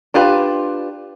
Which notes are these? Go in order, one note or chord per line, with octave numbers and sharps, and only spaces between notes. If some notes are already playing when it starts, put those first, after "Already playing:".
D4 F4 G4 B4